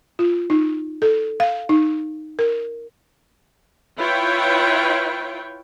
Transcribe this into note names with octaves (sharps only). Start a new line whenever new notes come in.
F4
D#4
A4
F5
D#4
A#4
E4 F4 B4 C#5 G5